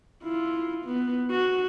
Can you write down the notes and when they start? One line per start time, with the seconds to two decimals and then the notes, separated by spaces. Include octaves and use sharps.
0.24 E4 F4
0.85 B3
1.31 F#4